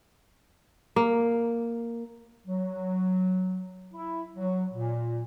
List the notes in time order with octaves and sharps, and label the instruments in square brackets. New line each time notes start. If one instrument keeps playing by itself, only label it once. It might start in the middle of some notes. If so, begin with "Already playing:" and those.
[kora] A#3
[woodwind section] F#3
E4
F#3
A#2